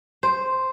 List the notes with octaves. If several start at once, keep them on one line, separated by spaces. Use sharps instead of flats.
C5